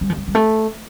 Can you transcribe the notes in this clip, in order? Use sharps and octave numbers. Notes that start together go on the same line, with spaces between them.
G3
F3
G3
G3
A3